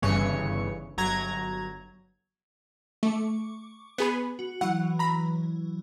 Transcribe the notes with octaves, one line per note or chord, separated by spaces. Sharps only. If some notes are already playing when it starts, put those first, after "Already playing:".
G1 G2 C#3 E3 C#5 C#7
G1 F#3 A#5 G#6
A3 C#6 D6
B3 G#4 B5
F#4
E3 F#3 F#5
A#5 B5